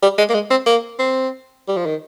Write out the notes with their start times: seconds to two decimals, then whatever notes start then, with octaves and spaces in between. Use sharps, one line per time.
0.02 G3
0.18 G#3
0.29 A#3
0.34 G#3
0.50 C4
0.66 A#3
0.99 C4
1.68 G3
1.77 F3
1.86 D#3